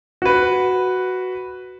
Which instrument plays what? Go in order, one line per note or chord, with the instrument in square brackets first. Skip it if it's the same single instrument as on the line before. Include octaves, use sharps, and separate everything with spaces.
[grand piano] F#4 B4